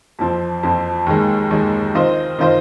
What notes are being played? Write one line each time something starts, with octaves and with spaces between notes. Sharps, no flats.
F2 F3 C4
F2 F3 C4
D#2 D#3 G#3
D#2 D#3 G#3
D#3 C4 F4 C5 D#5
D#3 C4 F4 C5 D#5